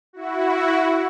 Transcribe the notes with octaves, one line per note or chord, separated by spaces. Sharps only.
E4 F#4